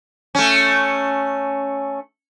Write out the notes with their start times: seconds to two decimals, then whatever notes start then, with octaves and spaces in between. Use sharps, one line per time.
0.35 A3 C#4